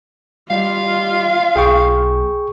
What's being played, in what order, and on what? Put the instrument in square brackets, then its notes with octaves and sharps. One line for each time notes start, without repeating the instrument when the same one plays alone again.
[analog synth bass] G3 [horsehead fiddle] F4 [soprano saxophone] F5
[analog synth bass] B1 [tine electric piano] G#4 G5 C#6